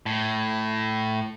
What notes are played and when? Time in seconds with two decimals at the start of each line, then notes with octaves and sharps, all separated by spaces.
0.06 A2